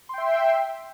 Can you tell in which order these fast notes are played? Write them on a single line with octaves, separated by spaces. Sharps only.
C6 G5 E5